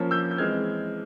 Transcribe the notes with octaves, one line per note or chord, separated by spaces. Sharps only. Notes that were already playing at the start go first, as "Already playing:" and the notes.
Already playing: F3 A#3 C#4
E6 G6
G6
E3 G#3 C4 F6 G#6